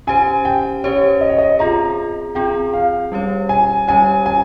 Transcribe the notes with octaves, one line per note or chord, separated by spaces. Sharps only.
C#4 G4 C5 G#5
G5
C#4 G4 C5 C#5
D#5
C#5
D#5
C4 F4 G#4 A#5
C4 F4 G#4 G5
F5
G3 C#4 G4 C#5
G#5
G3 C#4 G4 C#5 G#5
G#5